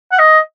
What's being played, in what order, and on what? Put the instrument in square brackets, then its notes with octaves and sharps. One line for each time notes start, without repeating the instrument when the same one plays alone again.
[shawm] F#5
D#5